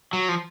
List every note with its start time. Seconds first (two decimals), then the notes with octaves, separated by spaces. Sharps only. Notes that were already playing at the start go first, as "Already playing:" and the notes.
0.13 F#3
0.29 F3